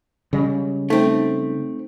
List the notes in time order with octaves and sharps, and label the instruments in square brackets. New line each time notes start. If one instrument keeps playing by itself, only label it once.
[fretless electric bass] C#3 G3 G#3
[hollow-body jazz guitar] A3 C4 [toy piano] D#4